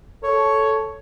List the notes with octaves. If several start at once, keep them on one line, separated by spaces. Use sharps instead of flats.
A4 C#5